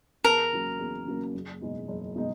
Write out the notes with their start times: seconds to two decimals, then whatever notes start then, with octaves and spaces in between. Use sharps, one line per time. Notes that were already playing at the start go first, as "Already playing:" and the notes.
0.24 E2 A#4
0.53 C#3 F#3 A#3
0.79 E2
1.06 C#3 F#3 A#3
1.34 F#1
1.61 E2 B2 G#3 D#4
1.88 F#1
2.16 B2 G#3 D#4